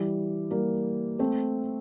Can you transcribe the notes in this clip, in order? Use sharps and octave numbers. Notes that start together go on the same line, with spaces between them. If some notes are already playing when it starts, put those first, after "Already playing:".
Already playing: E3 G3
G3 A#3
A3 C4